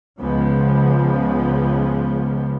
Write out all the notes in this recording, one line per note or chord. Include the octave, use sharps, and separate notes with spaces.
C#2 C#3 F3 G#3 B3